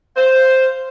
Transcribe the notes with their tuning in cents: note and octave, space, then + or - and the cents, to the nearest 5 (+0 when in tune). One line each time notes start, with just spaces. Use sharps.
C5 +0 F5 -10